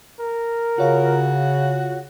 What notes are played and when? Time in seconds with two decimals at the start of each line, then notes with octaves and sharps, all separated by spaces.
0.20 A#4
0.78 C#3 F4 F#4 C#5 F5